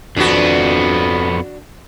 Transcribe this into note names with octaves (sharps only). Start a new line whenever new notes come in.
F2 B3 D4 F#4